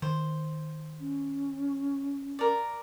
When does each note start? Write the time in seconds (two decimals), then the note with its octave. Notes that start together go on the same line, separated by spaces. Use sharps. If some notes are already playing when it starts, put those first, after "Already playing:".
0.02 D#3 C5
1.00 C#4
2.39 A#4 D5